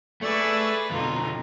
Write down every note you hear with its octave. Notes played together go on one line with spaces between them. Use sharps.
A3 G#4 B4 D5 C#6 E6
F2 B2 D3 D#4 F4